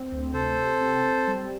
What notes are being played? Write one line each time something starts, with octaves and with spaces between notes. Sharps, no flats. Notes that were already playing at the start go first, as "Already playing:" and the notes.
Already playing: C4
D2
C3 A4 C5
C3
C4
C4
G3